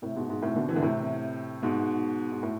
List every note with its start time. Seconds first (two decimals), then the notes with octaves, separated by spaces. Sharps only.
0.02 A2 C3
0.16 G#2 B2
0.29 G#2 B2
0.42 A2 C3
0.55 B2 D3
0.69 C3 E3
0.76 D3
0.82 A2 C3
1.62 G#2 B2
2.32 G#2
2.43 A2